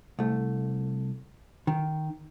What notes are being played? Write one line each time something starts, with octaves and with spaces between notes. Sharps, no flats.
C2 A3
D#3